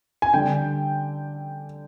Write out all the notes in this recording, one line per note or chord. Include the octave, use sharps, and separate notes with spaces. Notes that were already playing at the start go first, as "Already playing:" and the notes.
G#5
D3 G3 D4 G5